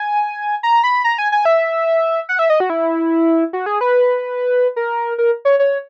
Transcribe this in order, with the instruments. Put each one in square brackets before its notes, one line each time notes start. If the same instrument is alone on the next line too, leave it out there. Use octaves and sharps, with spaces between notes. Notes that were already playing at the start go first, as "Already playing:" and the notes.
Already playing: [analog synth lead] G#5
A#5
B5
A#5
G#5
G#5
E5
F#5
E5
D#5
F#4
E4
F#4
G#4
B4
A#4
A#4
C#5
C#5